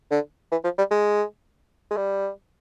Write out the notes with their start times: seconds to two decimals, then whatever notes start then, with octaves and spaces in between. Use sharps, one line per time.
0.11 D3
0.51 E3
0.64 F3
0.78 G3
0.91 G#3
1.91 G#3
1.97 G3